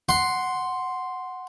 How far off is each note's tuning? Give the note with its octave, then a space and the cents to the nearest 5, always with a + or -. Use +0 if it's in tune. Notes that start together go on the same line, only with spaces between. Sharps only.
F#5 +0 C6 +0